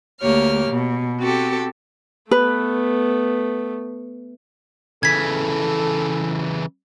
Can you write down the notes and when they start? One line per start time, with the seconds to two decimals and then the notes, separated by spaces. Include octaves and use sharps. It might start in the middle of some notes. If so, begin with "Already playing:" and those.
0.21 D2 A#3 G4 C#5 F6
0.70 B2
1.19 C4 F#4 G4 A4
2.31 A3 B3 B4
5.03 C#3 E3 A4 G#6 B6